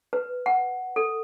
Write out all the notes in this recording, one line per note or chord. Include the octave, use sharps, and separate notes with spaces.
B4
F#5
A4